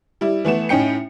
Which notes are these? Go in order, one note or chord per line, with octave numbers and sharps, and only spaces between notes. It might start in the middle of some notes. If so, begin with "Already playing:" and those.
G3 E4
E3 A3 B3 E7
A2 C#4 D#4 G5 C#7